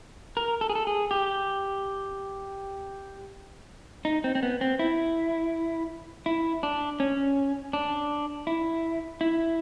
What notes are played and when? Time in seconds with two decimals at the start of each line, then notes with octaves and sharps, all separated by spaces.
0.37 A#4
0.61 A4
0.70 G#4
0.75 A4
0.87 G#4
1.11 G4
4.05 D#4
4.24 C4
4.35 C4
4.43 B3
4.61 C4
4.79 E4
6.26 E4
6.63 D4
7.00 C#4
7.73 D4
8.47 E4
9.21 E4